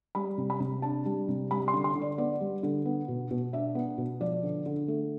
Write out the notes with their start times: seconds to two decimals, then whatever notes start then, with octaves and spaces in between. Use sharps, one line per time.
0.15 G3 B5
0.38 C3
0.50 B5
0.60 C3
0.82 D4 A5
1.05 G3
1.28 C3
1.51 G3 B5
1.68 C6
1.73 D3
1.84 C6
1.95 D3
2.01 D5
2.18 B3 D5
2.41 G3
2.63 D3
2.86 B3
3.08 B2
3.31 B2
3.53 D4 E5
3.75 B3
3.98 B2
4.20 F3 D5
4.43 D3
4.66 D3
4.88 A3